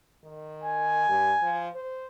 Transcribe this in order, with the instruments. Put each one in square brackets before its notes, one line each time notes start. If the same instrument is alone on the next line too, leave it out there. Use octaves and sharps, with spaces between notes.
[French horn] D#3
[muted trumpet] G#5
[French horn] G2
F3
C5